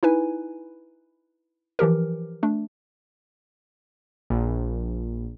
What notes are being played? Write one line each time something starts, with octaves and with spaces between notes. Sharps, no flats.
D#4 E4 B4 G#5
E3 F3 G4 A#4
A3 D4
A#1